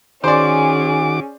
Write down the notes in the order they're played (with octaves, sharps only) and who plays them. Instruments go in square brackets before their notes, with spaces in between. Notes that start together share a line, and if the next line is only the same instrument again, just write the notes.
[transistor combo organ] D#3 F#4 D6 [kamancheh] C#4 G#4 [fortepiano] C5 D5